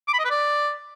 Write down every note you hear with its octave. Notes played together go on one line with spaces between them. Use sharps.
D6
B5
D#5
B4
D5